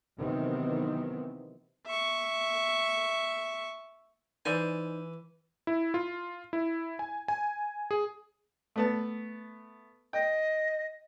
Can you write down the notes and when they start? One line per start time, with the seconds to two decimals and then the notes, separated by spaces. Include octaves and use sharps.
0.19 C3 D#3 E3 F#3 B3 C4
1.87 E5 C#6
4.45 E3 D#4 C5 D5 G#5
5.67 E4
5.94 F4
6.53 E4
6.99 G#5
7.28 G#5
7.91 G#4
8.76 A3 B3 A5
10.13 D#5 G5